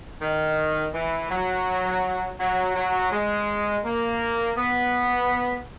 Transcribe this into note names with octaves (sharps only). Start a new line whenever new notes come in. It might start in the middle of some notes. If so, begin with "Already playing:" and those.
D#3
E3
F#3
F#3
F#3
G#3
A#3
B3